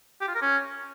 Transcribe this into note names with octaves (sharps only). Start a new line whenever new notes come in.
G4
F4
A#4
C#4